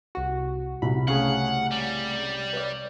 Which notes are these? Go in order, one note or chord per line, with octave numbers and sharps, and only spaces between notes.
C2 F#4
C2 F#4 B5
A2 C#3 G#4 C#5 F5 F#5
G3
B4 C#5 D5